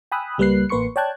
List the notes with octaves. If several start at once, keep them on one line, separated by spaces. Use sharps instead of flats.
G5 G#5 B5 D#6 E6 F#6
C#2 G3 A#3 B4 F#6 C7
A1 A#3 B4 C6 C#6 C#7
C#5 D5 G5 A5 F#6 G#6